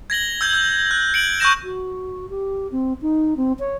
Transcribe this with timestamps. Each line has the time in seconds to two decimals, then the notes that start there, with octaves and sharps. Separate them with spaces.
0.10 G#6 A#6 F#7 G7
0.41 E6 G6 G#6
0.53 E6 G6
0.91 F#6
1.14 C#7 D7 F#7
1.40 C#6 E6 F#6 G6 A#6 E7
1.64 F#4
2.30 G4
2.72 C4
3.02 D#4
3.37 C4
3.59 C#5